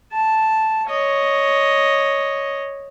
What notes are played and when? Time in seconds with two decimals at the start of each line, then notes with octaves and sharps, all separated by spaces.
0.12 A5
0.87 C#5 D#5